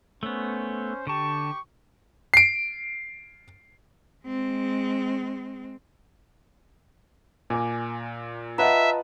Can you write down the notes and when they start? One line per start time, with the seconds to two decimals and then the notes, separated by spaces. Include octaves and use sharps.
0.23 A3 B3 C#4 C5
1.07 D3 G4 A5 C#6
2.34 C7 D7
4.26 G#3 C4
7.50 A#2 A#4 G#5 D6
8.58 F4 B4 D#5 E5 F#5 A5 A#5